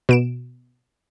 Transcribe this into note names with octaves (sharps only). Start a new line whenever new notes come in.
B2 D7 E7